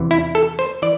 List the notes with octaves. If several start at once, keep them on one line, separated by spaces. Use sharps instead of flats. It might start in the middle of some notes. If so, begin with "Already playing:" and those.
Already playing: E2 C3 E3
E4
A4
C5
E3 D5